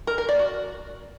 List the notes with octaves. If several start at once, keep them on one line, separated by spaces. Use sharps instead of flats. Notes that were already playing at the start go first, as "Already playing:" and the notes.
A#4
A#4
D5
F#4